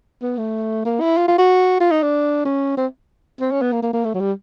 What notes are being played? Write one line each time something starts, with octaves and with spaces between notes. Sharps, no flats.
B3
A3
A#3
E4
F4
F4
F#4
F4
D#4
D4
C#4
C4
C4
C#4
B3
A#3
A#3
A#3
A3
F#3
G3